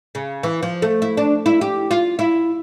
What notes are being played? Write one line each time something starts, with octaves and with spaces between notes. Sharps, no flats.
C#3
E3
F3
A3
E4
D4
E4
G4
F4
E4